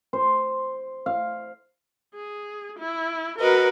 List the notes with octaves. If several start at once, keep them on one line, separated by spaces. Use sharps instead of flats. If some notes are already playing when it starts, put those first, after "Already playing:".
C5
F5
G#4
E4
F#4 A#4 B4 D#5 F#5